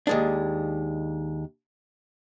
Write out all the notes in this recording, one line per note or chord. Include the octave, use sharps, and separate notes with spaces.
D#2 G#3 D4